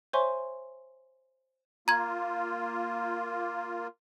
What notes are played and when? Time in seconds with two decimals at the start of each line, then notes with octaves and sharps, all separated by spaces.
0.13 C5 C#5 E5 G#5 C6 C#6
1.88 A#3 F4 A#5 G#6